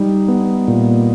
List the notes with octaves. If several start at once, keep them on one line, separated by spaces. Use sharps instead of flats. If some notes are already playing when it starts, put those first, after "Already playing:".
Already playing: G3 D#4
B3
A#2